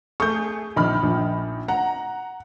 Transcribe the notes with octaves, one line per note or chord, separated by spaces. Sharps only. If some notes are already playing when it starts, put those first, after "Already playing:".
A3 G#4 C#6 G6
A#1 D#3 B5 F6
A#1
F#5 A#5